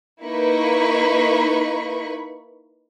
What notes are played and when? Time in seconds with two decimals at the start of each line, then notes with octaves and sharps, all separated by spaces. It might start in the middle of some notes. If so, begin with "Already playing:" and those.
0.24 A#3 D#4 E4 B4 B5 C#6